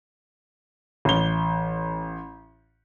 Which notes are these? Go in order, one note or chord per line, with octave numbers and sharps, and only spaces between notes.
A1 G7